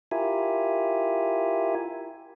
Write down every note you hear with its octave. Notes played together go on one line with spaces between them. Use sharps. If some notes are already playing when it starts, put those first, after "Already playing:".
E4 F4 G4 A#4 E5 G#5